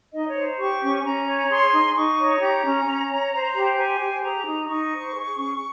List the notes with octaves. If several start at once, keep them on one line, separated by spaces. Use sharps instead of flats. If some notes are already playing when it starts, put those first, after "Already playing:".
D#4 D#5
C#5
C5
G4 C#6
C#4
C#4 A#5
C#5
G#4 C6
D#4
D#4 C#6
C#5
G4 A#5
C#4
C#4
C#5
C5
G4
C5 G#5
G4
G#4 A#5
D#4
D#4 C#6
C5
G#4
C#4